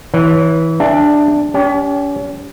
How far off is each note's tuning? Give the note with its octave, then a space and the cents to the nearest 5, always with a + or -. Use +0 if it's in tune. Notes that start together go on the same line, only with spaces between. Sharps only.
E3 -20 C#5 +0
D4 +10 G#4 -40 E5 +0
C#4 +40 G4 +0